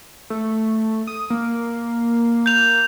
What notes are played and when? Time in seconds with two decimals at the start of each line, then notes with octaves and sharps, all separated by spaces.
0.30 A3
1.07 D#6
1.30 A#3
2.46 G6 F7